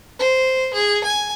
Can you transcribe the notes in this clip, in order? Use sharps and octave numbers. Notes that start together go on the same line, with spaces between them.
C5
G#4
G#5